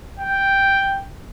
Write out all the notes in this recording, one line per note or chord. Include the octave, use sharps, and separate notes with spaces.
G5